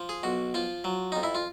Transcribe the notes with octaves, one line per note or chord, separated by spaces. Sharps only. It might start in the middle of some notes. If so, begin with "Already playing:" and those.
Already playing: F3
G#4
B1 F#4
F3 F4
F#3
F2 D#4
E4
F4